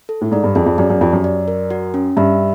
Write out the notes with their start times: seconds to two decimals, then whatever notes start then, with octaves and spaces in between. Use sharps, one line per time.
0.09 A4
0.21 A2
0.31 G#2 D5
0.44 G2
0.55 F2 G#4
0.66 F2
0.78 F#2 D5
0.90 F#2
1.01 F2 G4
1.13 F#2
1.24 D5
1.48 A#4
1.70 F#4
1.94 C#4
2.17 G2 E5